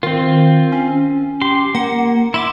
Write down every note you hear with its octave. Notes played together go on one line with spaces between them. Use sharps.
D#3 C4 F4
C#4
G4 C6
A#3 F#5
E4 E5 C6 D6